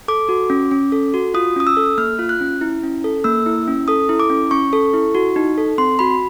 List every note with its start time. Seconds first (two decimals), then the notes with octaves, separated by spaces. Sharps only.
0.08 A4 D6
0.29 F#4
0.50 C#4
0.71 C#4
0.92 A4
1.14 F#4
1.34 F4 D#6
1.56 C#4 D#6
1.67 E6
1.77 A4
1.98 A#3 F6
2.19 F4
2.29 F#6
2.40 C#4
2.61 E4
2.83 C#4
3.04 A4
3.24 A#3 E6
3.46 E4
3.68 C#4
3.88 A4 D#6
4.09 E4
4.20 D6
4.30 C#4
4.51 C#4 C#6
4.73 A4
4.94 E4
5.15 F#4
5.36 D#4
5.58 A4
5.78 C4 C6
5.99 F#4 B5